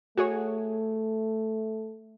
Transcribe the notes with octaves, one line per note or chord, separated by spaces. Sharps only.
A3 F#4 G#4 C#5